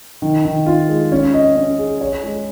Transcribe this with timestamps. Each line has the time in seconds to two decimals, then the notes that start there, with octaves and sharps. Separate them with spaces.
0.22 D#3
0.45 D#3
0.66 F4
0.89 G#3
1.12 C#4
1.34 D#5
1.56 C#4
1.79 G#4
2.01 C#5
2.23 G#3